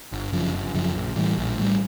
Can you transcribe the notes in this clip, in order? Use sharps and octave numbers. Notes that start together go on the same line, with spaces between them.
G1
F#2 C#3 F3
G1
F#2 C#3 F3
A#1
A2 E3 G3
A#1
A2 E3 G3